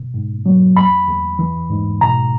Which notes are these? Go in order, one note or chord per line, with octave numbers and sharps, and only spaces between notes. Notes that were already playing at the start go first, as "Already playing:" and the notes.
Already playing: B2
G#2
F#3
E2 B5
E2
E3
G#2
B2 A#5